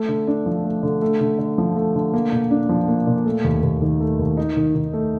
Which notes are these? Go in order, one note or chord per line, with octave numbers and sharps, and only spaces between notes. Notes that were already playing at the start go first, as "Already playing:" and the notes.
Already playing: A3
D3
D4
F3
A3
D3
A3
D3
D3
F3
A3
D3
A#3
A#2
D4
F3
A#3
A#2
A3
D#2
D#2
D#3
A3
D#2
D#4
D#3
D#3
A3